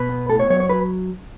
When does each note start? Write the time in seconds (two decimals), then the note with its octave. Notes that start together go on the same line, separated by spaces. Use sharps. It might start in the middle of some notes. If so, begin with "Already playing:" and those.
Already playing: B2 B4
0.09 B3
0.29 A2 A4
0.39 C#5
0.50 F#3 C#5
0.60 C#5
0.69 F#3 B4